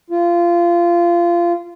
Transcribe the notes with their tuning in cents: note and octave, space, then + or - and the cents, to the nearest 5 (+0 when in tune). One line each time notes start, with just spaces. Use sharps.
F4 -20